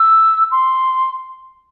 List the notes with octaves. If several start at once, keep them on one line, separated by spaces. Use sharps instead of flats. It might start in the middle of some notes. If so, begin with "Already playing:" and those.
Already playing: E6
C6